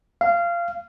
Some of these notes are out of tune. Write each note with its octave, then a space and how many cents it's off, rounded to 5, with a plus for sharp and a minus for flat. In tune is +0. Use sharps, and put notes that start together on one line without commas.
F5 -20